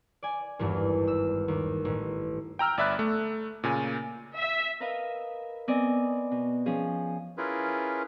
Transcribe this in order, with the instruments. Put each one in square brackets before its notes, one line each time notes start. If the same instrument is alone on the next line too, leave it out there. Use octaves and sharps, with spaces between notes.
[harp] D5 G#5
G#1 E2 G2
E6
D#2
A1
[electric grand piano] G5 A#5 E6 F6
G1 D5 E5 B5 F#6
A3
A#2 C#3 G#5
[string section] E5
[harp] A#4 B4 D#5 F5
B3 C4 D5 D#5 G#5
B2
F3 C#4 G#4
[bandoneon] C#4 E4 F4 G#4 A#4 B4